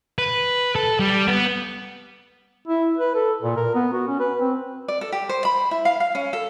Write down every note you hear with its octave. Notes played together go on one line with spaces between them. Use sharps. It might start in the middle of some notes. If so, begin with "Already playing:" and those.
B4
A4
G3
B3
E4
B4
A4
A#2
A#4
B3
F#4
C#4
B4
C4
D5
A4
G4
C5
B5
E4
F5
F5
C#4
A4